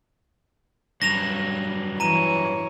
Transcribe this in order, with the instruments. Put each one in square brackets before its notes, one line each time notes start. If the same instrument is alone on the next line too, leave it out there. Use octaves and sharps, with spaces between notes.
[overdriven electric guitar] G2 F#3 [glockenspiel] A#6 E7 F7
[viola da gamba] E3 C#5 [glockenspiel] A#5 D#7